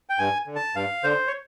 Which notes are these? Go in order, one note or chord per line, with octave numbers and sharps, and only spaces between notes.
G5
G2 G#5
D3
A5
G2 F5
D3 C5
C#5